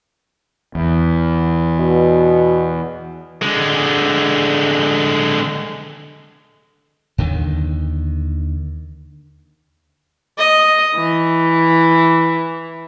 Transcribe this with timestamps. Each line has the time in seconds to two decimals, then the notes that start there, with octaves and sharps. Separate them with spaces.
0.75 E2
1.79 B2
3.42 D3 G#3
7.18 D#2 D3 D#3
10.38 D#5
10.95 E3